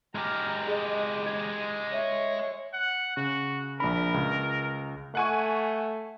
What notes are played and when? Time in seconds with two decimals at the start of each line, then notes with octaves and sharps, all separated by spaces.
0.15 G#3 G4 A#5 F6
0.67 G#4 D#5
1.26 G#6
1.93 C#5 E5
2.73 F#5
3.17 C#3 F#4
3.80 A#1 D4 A#4 B5
4.14 C#2
5.15 A3 F#5 G#5 C#6